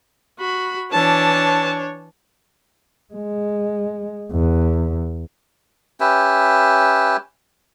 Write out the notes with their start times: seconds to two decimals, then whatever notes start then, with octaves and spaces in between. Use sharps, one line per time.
0.39 F#4 B5
0.92 E3 D4 C#5 A5
3.14 G#3
4.31 E2
6.00 C#4 G4 B4 E5